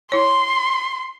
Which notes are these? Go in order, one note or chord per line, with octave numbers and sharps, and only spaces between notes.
E4 C#5 C6